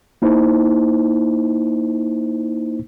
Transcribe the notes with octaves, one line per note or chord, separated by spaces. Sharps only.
A#3 D#4 E4 C5